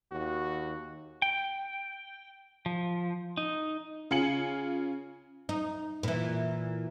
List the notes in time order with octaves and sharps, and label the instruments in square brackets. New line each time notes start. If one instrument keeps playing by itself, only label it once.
[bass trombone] D#2 [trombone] F#4
[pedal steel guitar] G5
F3
D#4
[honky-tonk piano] C#3 F4 G#5 C#7 F#7
[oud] D#4
A#2 E3